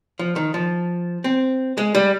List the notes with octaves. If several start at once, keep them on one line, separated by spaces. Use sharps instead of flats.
F3
D#3
F3
C4
G#3
G3